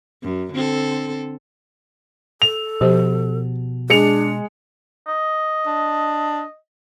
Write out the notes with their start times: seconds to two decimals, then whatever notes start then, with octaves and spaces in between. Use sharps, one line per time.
0.23 F#2
0.53 D3 C4 A4
2.42 A4 F7
2.81 B2 F3 G4 C5
3.90 G#3 D4 C#7 F7
5.08 D#5
5.66 D4